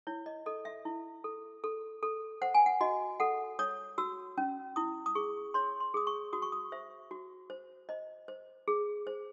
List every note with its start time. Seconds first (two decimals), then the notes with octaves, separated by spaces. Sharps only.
0.07 E4 C#5
0.26 D#5
0.46 A4 D#5
0.65 E5
0.85 E4
1.24 A4
1.64 A4
2.03 A4
2.42 C5 F#5
2.54 G#5
2.66 F#5
2.81 F#4 D#5
3.20 A4 F#5
3.59 C#5 D#6
3.98 F#4 E6
4.38 C#4
4.76 E4 D#6
5.06 D#6
5.15 G#4 C#6
5.54 C#5 C6
5.80 C6
5.94 G#4 D#6
6.07 C#6
6.33 F#4 D#6
6.42 C#6
6.52 D#6
6.72 C5 E5
7.11 F#4
7.50 C5
7.89 C5 D#5
8.28 C5
8.68 G#4
9.07 C5